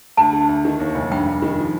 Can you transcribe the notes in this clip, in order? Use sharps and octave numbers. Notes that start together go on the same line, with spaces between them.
D2 A5
D3
D2
D#3
D#2
F1
G2 G5
G2
D#3
F3